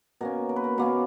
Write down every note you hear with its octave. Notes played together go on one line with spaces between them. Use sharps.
B2 A#3 C#4 A#4
A#4
B4
A#4
B2 A#3 C#4 B4